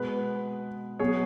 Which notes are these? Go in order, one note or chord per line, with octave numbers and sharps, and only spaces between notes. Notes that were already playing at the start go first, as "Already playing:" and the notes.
Already playing: B2 G#3 B3 B4
B2 F#3 B3 G#4 C#5